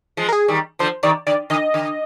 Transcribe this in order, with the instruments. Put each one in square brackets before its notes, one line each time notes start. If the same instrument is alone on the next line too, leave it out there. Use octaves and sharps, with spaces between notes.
[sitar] F3 G#3
[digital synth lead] A#4
G#4
[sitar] D#3 G3
[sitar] D3 F3 [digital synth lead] C5
[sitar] C3 D#3 [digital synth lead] D5
[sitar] D3 [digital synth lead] D5
[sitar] D3 [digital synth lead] D#5
[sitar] D3